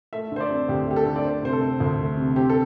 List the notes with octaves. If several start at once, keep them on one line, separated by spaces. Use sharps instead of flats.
A3 E5
D3 C5
D5
C4
D2 G4
A3 G4
A4
D3
D5
A3 C5
C3 C5
A4
C4
D2
A3
C3
C4 G4
A4